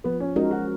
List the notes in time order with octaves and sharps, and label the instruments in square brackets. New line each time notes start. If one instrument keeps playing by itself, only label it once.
[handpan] F3 [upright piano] B3
[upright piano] C#4
[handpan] G#3 C#4 F#4 A#4 [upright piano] D#4
[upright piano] F#4